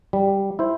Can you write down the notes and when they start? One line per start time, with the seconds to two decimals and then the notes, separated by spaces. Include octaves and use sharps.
0.13 G3
0.59 E4 C5